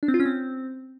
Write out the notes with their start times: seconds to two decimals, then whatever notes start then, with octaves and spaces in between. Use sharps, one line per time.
0.03 D4
0.08 C4
0.14 F4
0.20 C#4
0.25 C4